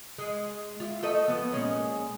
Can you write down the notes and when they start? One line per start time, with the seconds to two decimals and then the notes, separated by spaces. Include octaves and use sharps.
0.18 G#3
0.80 E4 F4
1.03 A3 A4 D#5
1.28 F3 B3
1.53 A#2 G#3 C#4